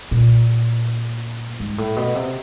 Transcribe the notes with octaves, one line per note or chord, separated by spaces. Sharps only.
A#2
G#2
A2
B2
C3